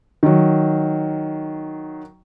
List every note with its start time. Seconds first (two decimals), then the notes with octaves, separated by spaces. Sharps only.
0.23 D#3 F#3